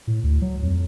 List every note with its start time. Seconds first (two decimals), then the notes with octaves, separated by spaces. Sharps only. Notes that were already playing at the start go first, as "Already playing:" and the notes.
0.07 A2
0.24 D2
0.42 F#3
0.63 F2